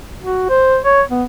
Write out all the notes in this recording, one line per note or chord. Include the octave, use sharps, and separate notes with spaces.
F#4
C5
C#5
B3